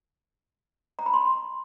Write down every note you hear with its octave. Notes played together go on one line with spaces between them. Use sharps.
A#5
B5
C6